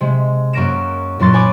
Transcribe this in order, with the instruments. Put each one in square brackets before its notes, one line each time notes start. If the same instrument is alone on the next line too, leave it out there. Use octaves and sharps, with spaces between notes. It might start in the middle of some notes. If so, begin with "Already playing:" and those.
[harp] C3 G#3
F#2 F#3 A#3 A#6 D7 E7
F#2 A#2 F#3 C6 A6
C#5 G#5 B5 D6